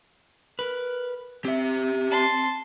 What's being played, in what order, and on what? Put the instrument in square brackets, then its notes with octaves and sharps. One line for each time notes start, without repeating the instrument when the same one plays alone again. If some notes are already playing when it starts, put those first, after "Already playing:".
[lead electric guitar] A#4 B4
[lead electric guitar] C4 [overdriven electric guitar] G4 E5
[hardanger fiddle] A5 C6